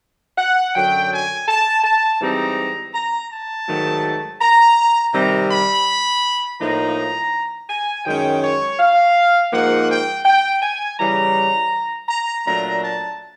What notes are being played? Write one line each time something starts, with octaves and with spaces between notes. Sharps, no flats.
F#5
F#2 D3 F#3 G5
G#5
A5
A5
G#2 E3 G3 C4 D#4 A#5
A#5
A5
G#2 D#3 F#3 A3
A#5
C3 D#3 G3 C4 A#5
B5
A2 F3 A#3 D#4 A#5
G#5
F#2 D#3 G#3 C#4 G5
C#5
F5
G#2 F3 A#3 D#4 F#5
G5
G5
G#5
C#3 E3 G3 A#5
A#5
A#2 F#3 A3 D4 A#5
A5